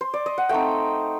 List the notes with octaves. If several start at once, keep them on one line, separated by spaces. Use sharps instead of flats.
C5
D5
D#5
F#5
A3 C4 D#4 G5